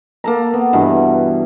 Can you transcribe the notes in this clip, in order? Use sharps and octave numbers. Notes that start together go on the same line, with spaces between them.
A#3 A4 A#5
B3
G2 B2 E3